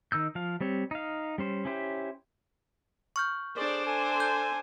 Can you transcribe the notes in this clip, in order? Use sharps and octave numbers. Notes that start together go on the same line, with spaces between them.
D#3 D#4 E6 G6
F3 F5
G3 C4 C#5
D#4 F5
G3 C#4 C5
C#4 E4 G4 C5
C#6 F6 G6
D4 G#4 A4 C5 D5
A4 G#5
G6